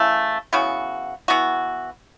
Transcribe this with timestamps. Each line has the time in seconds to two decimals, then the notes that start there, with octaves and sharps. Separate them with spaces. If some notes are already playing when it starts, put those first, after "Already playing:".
Already playing: C#3 E3 A3
0.53 C#3 E3 B3 F#4
1.28 E3 B3 F#4